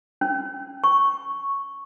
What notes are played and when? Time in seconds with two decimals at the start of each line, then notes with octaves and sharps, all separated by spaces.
0.21 C#4
0.84 C#6